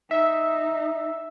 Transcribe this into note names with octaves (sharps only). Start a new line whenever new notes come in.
D#4 E5